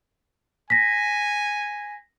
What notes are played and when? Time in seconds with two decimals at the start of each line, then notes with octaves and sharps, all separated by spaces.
0.70 G#5 A#6 B6